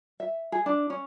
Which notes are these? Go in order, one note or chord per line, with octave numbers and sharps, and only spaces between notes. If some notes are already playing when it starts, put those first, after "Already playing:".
E5
G#4
D4
C#4